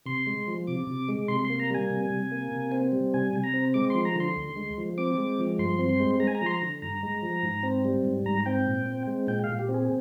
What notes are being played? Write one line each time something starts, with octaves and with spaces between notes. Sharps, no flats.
C3 C6
G#3
F3
C3 D6
C3
G#3
C3 C6
C6
A#3
A#5
G3 G#5
C3
C3
A#3
C3
C4
G3
C3 G#5
C3
A#5
C4
G#3 D6
F3 C6
A#5
D3 C6
D2
G#3
F3
C4 D6
G#3
F3
G2 C6
C4
C6
G#3
G#3 A#5
G#5
A#5
F3 C6
A#5
D3
G2 A#5
G#3
F3
G#2
C4
G3
G#2
G#2 A#5
C4 G5
A#2
C4
G#3
A#2 G5
F5
A#2
G4
C4
G#4